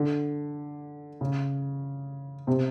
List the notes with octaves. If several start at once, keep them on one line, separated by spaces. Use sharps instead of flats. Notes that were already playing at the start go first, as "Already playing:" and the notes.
Already playing: D3
C#3
C3